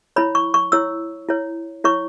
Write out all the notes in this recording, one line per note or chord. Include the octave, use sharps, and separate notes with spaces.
E4 C#5 B5
C#6
C#6
E4 C#5 E6
E4 C#5
E4 C#5 C#6